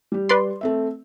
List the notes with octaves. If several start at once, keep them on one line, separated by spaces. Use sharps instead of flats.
G3 G4
B4 D5 C6
A3 C4 E5